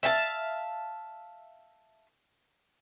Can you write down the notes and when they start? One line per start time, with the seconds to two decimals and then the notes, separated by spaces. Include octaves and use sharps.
0.03 E5 F5 G5 A5